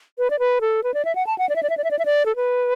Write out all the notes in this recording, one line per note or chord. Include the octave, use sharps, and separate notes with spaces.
B4
D5
B4
A4
B4
D5
E5
F#5
A5
F#5
D5
E5
D5
E5
D5
E5
D5
E5
D5
A4
B4